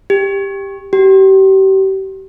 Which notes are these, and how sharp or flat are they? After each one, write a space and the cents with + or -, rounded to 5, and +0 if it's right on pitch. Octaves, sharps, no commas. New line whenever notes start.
G4 +10
G4 -35